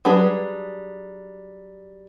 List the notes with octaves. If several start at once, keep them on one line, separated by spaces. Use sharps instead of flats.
F#3 G3 D4 G#4 B4